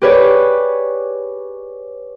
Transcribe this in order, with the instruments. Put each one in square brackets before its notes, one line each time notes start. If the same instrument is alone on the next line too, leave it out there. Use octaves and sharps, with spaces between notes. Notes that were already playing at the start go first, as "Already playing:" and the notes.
[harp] G4 G#4 B4 C#5 D5